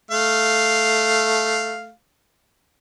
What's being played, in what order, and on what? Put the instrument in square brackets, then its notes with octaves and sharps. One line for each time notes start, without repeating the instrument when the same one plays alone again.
[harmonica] A3 F5